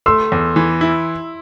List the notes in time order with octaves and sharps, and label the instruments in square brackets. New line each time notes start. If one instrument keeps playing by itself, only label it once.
[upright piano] A3 [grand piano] C6 E6
[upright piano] E2
E3
E4